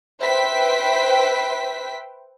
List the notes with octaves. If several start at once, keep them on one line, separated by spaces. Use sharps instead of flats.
B4 C5 E5 G5 B6